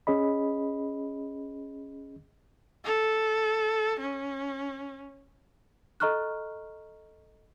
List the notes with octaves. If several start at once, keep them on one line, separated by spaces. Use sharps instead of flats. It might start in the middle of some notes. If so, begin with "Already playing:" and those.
C#4 G#4 D#5 B5
A4
C#4
A4 D#5 A#5 C#6 F6 F#6